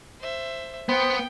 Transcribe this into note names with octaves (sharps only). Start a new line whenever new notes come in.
C5 E5
B3 C5 G5